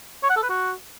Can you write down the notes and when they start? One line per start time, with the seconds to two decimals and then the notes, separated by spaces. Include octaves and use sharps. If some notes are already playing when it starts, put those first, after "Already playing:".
0.23 C#5
0.30 F#5
0.36 A4
0.43 B4
0.50 F#4